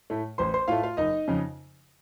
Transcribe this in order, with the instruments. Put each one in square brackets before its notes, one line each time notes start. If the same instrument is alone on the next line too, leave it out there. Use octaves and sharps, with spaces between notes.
[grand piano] A2 A3
A1 C5 C6
C5 C6
A2 A3 F4 F5
F4 F5
F#1 D#4 D#5
F2 C#3